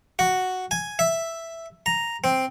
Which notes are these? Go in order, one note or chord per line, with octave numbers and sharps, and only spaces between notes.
F#4
G#5
E5
A#5
C4